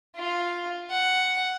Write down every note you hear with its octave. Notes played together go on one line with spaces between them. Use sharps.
F4
F#5